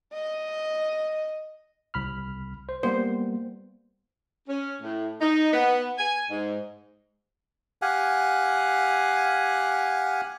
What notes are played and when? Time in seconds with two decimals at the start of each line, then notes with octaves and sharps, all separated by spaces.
0.14 D#5
1.94 C2 B5 F6
2.69 C5
2.83 G3 A#3 B3 C5
4.48 C#4
4.82 A2
5.21 D#4
5.53 B3
5.98 G#5
6.30 G#2
7.82 G4 F5 F#5 G#5